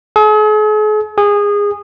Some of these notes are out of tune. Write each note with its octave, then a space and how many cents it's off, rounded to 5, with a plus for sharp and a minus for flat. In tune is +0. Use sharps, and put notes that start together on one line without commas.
G#4 +45
G#4 -20